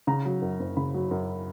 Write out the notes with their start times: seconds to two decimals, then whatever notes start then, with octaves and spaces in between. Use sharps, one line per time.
0.07 C#3 A#5
0.25 F#3
0.42 F#2
0.59 F#1
0.77 C#3 B5
0.94 F#3
1.11 F#2